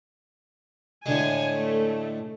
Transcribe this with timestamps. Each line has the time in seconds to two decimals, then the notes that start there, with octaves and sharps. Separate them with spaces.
1.06 A2 D3 G#3 G#5
1.52 A3